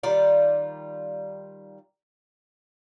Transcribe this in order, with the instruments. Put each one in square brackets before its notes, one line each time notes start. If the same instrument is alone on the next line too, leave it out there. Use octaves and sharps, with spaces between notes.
[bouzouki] D#3 G3 F4 D5